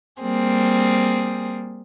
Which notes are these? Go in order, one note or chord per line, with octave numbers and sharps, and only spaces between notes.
G3 A#3 C4 G#4